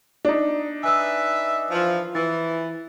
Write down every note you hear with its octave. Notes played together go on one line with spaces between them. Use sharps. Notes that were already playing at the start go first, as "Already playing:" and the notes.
D4 D#4
B4 E5 G#5 E6
E3 F3
E3 E4 A6